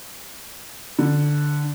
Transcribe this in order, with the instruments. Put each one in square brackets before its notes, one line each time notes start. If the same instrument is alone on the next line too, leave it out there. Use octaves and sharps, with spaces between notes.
[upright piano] D3